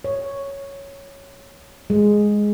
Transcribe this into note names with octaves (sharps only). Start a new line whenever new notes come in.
C#5
G#3